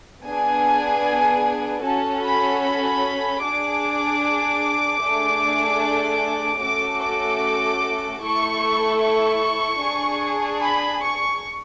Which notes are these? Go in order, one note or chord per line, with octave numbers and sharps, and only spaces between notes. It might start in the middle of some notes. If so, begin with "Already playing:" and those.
B3 D4 G#4 G#5
C#4 F#4 A4 A5
B5
B5
D4 G#4 D6
A3 D4 G#4
A3 C#4 F#4 A4 D6
D6
A3 E4 A4 C#6
C#6
D4 G#4
B5
C#6